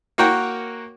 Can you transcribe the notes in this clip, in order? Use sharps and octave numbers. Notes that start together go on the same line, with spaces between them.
A#3 F#4 A#4 C#5 F#5 G5